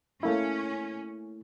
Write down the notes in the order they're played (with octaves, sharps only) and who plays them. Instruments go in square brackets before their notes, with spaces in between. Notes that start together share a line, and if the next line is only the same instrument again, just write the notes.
[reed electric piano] A3 A#3 E4 [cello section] C#4